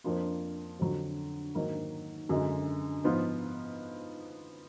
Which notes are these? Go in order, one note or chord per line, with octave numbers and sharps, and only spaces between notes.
F2 F3 A#3 D4 F4
F2 D3 F#3
G#2 D#3 F#3 A#3
F#2 D3 G#3
G#2 F3 B3 F4